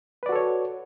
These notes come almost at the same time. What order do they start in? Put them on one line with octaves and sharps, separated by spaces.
B4 D5 F#4 A4 C#5